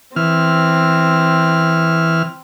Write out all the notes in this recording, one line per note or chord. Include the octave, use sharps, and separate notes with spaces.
E3 C4 F6